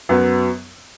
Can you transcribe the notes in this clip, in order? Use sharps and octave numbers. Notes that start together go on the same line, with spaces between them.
F#2 F#3 B3